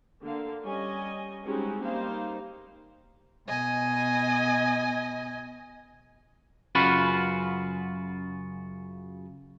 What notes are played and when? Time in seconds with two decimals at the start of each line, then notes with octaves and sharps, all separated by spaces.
0.23 D3 A#3 F5
0.64 G3 C#4 D#5 G#5
1.45 G3 G#3 C4 C#4 D#4 F#4
1.81 G3 A#3 D#4 C5 F5
3.47 B2 D#5 G#5
6.75 F#2 C#3 F4 F#4 B4 B5